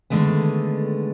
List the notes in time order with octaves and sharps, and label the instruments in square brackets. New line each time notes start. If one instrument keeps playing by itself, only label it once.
[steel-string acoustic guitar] D3 D#3 G#3 A3 B3